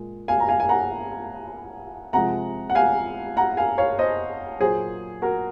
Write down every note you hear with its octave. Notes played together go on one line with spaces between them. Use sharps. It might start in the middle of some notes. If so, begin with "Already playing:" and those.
Already playing: A#2 G#3
F5 G#5
A#5
F5 G#5
G#5
F#5 A#5
C3 F3 G#3 F#5 A#5
F#5
F5 G#5
F#5 A#5
F5 G#5
C#5 F5
C5 D#5
A#2 F#3 G#4 C5
F#4 A#4